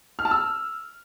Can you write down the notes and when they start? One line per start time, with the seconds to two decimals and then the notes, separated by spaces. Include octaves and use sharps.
0.19 F6
0.25 A5
0.31 E6